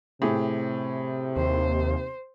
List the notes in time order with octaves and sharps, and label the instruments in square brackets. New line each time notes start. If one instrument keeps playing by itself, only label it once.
[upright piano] A2 G4 G#4 [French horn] C3
[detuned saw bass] D#2 [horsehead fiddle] C5